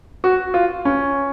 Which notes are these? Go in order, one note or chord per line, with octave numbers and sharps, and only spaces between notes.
F#4
F4
C#4